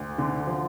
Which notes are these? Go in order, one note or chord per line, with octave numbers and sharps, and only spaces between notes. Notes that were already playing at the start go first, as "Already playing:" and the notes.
Already playing: D2
D3
F3